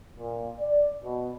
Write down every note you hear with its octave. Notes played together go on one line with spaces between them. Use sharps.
A#2
D5
B2